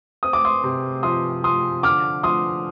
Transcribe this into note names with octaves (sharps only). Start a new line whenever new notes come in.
C4 D#6
D6
C6 D#6
C3
F3 C6 D#6
F3 C6 D#6
D3 D6 F6
F3 C6 D#6